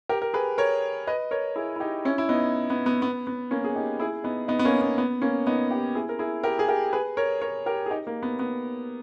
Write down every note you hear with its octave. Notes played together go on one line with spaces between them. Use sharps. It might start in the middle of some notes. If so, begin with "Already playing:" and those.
G4 A#4
A#4
G#4 B4
A#4 C#5
B4 D#5
A#4 C#5
E4 G#4
E4
D#4 G4
C#4 E4
E4
B3 D#4
B3
B3
B3
B3
A#3 C#4
G#4
D#4 G4
E4 G#4
B3 D#4
B3 D#4
B3
A#3 C#4
B3
B3
A#3 C#4
B3 D#4
D#4 G4
E4 G#4
A#4
E4 G#4
G4 A#4
G#4
G4 A#4
G#4 B4
A#4 C#5
A#4 C#5
G4 A#4
G#4
D#4 G4
A#3
B3
B3